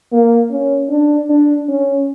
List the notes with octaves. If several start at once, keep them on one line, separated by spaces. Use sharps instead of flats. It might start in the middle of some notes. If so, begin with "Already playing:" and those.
A#3
C#4
D4
D4
C#4